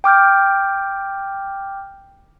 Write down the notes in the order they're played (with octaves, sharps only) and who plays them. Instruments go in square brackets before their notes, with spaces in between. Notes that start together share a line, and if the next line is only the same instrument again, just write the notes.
[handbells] G5 D6 F6 G6